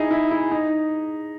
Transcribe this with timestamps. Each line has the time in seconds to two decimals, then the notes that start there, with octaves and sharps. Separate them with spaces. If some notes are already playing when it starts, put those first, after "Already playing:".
Already playing: D#4 E4 G#4
0.11 E4
0.31 E4
0.51 D#4